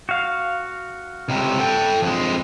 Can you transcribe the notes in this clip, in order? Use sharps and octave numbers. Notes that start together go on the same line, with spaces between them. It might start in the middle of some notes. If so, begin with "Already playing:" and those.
F#4 F5
C#2 C3
A4 G5
F2 G#3